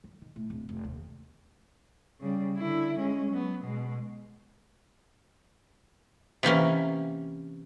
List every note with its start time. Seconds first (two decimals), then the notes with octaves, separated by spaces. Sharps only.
0.04 F#3
0.22 D#3
0.36 A2
0.50 D1
0.69 F1
0.84 D#2
2.20 C#3 G3
2.57 D3 E4
2.97 G#3 C#4
3.30 F#3 B3
3.63 B2 G#3
6.43 C3 E3 A#3 C#4